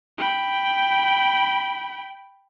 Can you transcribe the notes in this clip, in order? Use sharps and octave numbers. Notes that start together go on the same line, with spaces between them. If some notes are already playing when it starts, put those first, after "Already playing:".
G5 B5